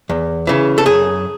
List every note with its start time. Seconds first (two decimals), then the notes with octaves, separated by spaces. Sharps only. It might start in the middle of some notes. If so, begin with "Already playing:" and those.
0.09 E2
0.47 C#3 E3
0.78 A4
0.86 F#2 G#4